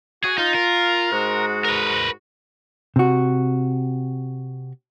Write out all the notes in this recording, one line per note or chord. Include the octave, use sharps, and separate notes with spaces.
F#4 G#4
D#4 F4
A#4
G#2 G#3 F#4
A#4 B4
C3 F#4